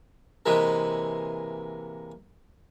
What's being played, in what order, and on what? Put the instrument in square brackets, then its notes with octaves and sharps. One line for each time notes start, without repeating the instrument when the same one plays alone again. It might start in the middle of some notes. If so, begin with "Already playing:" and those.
[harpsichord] C3 E3 G#3 A#3